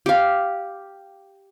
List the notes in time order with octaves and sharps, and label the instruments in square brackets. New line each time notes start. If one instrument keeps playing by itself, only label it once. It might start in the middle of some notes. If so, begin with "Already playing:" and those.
[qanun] G4 F5